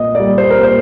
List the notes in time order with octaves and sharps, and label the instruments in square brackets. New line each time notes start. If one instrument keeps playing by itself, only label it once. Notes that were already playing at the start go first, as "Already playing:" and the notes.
Already playing: [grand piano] A#2 D#5
G3 A#3 D5
C5
A#4
A#2 C5